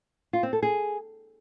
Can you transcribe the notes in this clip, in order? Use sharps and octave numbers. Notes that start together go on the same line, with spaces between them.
F4
C4
A4
G#4